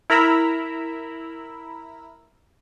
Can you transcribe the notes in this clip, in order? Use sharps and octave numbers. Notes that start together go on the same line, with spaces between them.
E4 A#4 A#5 B5 E6